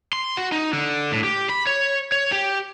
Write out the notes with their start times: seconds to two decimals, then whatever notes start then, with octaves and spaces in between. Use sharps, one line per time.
0.13 C6
0.37 F#4
0.52 D#4
0.73 D3
1.12 A2
1.24 G4
1.49 B5
1.67 C#5
2.12 C#5
2.32 G4